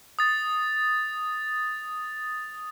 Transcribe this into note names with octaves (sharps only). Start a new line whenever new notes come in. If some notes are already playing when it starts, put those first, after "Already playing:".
D#6 A6